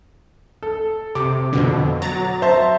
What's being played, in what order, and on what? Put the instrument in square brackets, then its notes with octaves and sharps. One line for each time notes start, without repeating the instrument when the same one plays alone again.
[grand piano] A4
[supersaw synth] C3 [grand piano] D6
[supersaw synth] F2 B2 D3
F#3 A#5 A6
[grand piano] C5 E5 A5